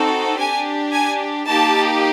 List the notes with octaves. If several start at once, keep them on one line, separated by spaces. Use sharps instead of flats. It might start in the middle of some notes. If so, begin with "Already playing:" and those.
Already playing: C4 D#4 F#4 A4
D4 G4 G#5
G#5
A#3 D#4 G4 A5